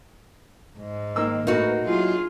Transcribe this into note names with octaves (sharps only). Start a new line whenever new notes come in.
G#2
D#3 A#3 E6
A2 D#4 F#4 A#4 B4
F#3 E4 F4 G#4